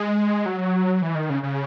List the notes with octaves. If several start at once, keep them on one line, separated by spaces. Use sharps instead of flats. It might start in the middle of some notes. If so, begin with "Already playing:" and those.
Already playing: G#3
F#3
E3
D#3
C#3
C#3